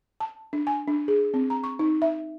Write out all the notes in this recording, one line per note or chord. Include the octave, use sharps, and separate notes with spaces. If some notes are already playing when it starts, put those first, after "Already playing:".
A5
D4
G#5
D4
G#4
C4
A#5
C#6
D#4
E5